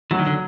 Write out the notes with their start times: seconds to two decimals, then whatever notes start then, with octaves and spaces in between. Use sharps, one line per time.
0.11 E3 F#3
0.19 D#3
0.26 D3